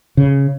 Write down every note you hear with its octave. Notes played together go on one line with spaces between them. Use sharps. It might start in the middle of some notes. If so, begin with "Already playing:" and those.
C#3